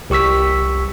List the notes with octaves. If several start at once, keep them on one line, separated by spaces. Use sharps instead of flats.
C2 G4 C#6 E6 B6